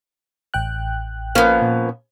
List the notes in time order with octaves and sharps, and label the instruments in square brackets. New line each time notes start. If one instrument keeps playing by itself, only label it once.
[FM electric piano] A1 G5 F#6
[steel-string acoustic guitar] F3 A#3 [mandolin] B3 C#4
[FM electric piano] A#2